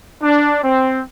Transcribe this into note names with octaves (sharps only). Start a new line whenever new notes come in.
D4
C4